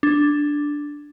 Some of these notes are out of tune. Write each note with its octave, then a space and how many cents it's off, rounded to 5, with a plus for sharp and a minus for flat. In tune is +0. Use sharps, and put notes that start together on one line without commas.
D4 +0